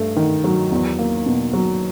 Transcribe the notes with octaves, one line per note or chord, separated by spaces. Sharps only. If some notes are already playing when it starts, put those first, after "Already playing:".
Already playing: G2 A3
D#3
F#3
E2
A#3
B2
F#3